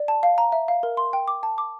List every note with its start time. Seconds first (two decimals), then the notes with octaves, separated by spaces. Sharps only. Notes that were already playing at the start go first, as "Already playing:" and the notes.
Already playing: D5
0.08 A5
0.23 F5
0.38 A#5
0.52 E5
0.68 F5
0.83 A#4
0.97 C6
1.13 G5
1.28 D6
1.43 A5
1.58 D6